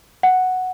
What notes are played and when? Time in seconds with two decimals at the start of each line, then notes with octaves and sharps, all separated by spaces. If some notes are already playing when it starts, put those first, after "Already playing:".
0.23 F#5